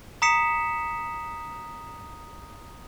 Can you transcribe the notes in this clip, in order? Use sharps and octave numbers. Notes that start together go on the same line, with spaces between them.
A#5 D#6 B6 C#7 E7